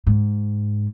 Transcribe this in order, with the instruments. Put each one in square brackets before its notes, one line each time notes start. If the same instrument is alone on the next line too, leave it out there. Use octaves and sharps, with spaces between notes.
[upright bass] G#2